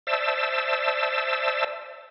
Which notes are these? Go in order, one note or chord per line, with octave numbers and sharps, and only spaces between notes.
C5 D5 E5 A5 E6